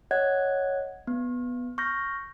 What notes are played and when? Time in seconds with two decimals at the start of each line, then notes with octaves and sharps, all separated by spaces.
0.11 C#5 D#5 F#5 F#6 G#6
1.07 B3
1.78 C#6 F6 G6 A#6